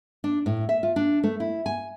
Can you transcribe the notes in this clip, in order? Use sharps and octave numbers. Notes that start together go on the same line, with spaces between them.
D4
A2
E5
F4
D4
A3
E4
G#5